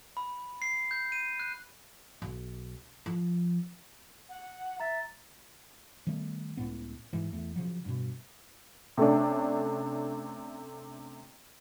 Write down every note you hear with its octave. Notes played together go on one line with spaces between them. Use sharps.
B5
C7
G6
D#7
F#6
B1
F3
F#5
E5 A#5 A6
D#3 G3 A3 B3
C#2 A2 B3
G#2 E3 G#3
E2 A3
C#3 F3 F#3
G2 B2
C3 A3 C#4 D4